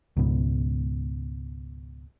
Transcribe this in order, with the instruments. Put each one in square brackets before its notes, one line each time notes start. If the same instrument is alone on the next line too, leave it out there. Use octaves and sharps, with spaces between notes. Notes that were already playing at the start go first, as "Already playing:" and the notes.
[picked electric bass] C#2 G#2 B2